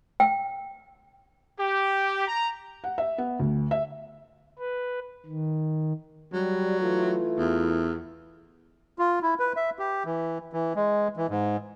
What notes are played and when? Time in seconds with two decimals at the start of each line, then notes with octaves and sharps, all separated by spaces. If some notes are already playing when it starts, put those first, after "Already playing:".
0.20 G5
1.59 G4
2.27 A#5
2.84 F#5
2.98 E5
3.18 B3
3.40 D2
3.71 E5
4.59 B4
5.26 D#3
6.32 F#3 G3
6.79 E3 A3 F4
7.38 E2
8.99 F4
9.22 E4
9.39 B4
9.57 E5
9.79 G4
10.06 E3
10.53 E3
10.75 G#3
11.17 E3
11.30 G#2